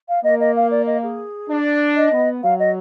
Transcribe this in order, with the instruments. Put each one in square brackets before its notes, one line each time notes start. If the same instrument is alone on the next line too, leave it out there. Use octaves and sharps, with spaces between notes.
[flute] F5
[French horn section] A#3 [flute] D#5
[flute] D#5
F5
D5
D#5
G#4
[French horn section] D4
[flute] D#5
[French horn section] B3
[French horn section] F#3 [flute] F5
[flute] D#5